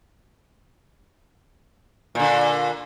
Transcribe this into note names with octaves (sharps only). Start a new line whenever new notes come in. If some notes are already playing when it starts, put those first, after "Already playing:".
A#2 D3